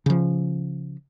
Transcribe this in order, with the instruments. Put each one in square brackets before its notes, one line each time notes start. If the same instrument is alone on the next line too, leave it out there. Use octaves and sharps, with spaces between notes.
[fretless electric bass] C#3 F3